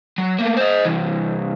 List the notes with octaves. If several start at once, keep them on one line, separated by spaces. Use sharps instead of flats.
F#3
A3 A#3
C5 D#5
C2 E3